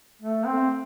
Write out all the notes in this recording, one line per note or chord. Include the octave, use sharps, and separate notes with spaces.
A3
C4